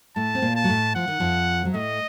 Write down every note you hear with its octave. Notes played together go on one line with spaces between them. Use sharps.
A2 A3 A5
C4
A#2 A#3
A5
F#3
A2 A3
F3 F#5
D#3
F2 F3
F#3
A2 A3 D#5